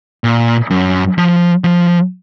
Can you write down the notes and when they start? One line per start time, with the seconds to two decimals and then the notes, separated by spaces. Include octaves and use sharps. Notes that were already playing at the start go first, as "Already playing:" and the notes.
0.24 A#2
0.70 F#2
1.18 F3
1.64 F3